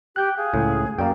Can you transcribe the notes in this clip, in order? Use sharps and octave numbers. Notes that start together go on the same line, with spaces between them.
G4 G5 F#6 G6
G#4 F5
C#2 A2
F#2 A#3 D5 F5 G5